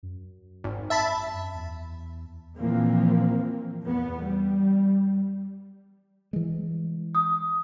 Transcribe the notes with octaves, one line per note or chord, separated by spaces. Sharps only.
F#2
G#1
E5 A5 B5
E2
A#2 E3 F3 A#3 C4
E2 B3
G3
E3 G#3
D#6